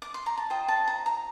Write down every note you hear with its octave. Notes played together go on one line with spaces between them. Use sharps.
D6
C6
A#5
A5
F4 C5 D#5 G5
A5
A#5
A#5